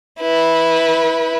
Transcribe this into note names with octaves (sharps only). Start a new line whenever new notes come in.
E4 B4